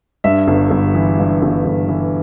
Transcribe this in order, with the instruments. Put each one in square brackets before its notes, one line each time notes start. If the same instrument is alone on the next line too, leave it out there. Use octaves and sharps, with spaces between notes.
[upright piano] G2 E5
G1
G1
E3
G2
G1
G1
E3